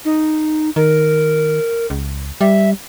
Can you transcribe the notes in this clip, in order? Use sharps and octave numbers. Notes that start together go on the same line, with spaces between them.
D#4
D#3 A#4
C#2
G3 E5